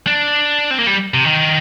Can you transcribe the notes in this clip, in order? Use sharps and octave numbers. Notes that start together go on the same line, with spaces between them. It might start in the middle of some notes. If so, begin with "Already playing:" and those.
D4
C4
A#3
G3
C3
D#3